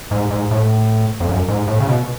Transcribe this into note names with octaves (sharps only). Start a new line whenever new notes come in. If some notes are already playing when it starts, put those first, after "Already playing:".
G#2
G#2
A2
F2
F#2
G#2
A2
C#3
B2